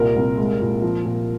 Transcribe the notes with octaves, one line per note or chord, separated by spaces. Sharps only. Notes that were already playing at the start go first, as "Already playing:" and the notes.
Already playing: C2 A#2 A#4
C2
G#3
A#2
F3
A#2